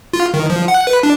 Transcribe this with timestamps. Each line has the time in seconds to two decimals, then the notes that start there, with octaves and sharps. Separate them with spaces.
0.13 F4
0.34 D#3
0.50 F3
0.68 F#5
0.87 B4
1.03 D4